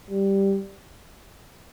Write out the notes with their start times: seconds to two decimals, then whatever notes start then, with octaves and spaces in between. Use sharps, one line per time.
0.11 G3